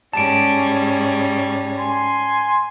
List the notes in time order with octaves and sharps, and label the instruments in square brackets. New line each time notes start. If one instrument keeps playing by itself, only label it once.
[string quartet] G#2 G3 C#4 [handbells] A5 D7
[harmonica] G#5 C6